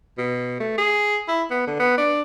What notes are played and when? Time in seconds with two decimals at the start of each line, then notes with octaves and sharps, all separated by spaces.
0.18 B2
0.60 A3
0.78 G#4
1.28 E4
1.51 B3
1.67 D3
1.80 B3
1.98 D4